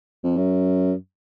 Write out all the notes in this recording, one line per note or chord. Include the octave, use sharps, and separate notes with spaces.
F2
F#2